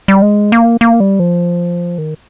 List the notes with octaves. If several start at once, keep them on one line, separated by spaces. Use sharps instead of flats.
G3
G#3
A#3
A#3
G3
F3
D#3